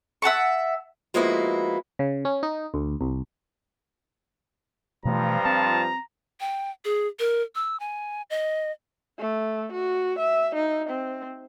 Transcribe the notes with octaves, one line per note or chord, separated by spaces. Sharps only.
E5 F#5 A5 C#6
F3 G#3 A#3 B3 E4 F#4
C#3
C#4
D#4
D2
C2
G2 B2 E3 F3 A3 A#5
C4 A5
G5
G#4
A#4
E6
G#5
D#5
A3
F#4
E5
D#4
C4